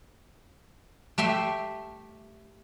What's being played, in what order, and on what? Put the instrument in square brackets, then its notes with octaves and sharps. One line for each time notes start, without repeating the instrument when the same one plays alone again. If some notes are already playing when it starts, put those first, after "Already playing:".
[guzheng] A3 G4 E5 C6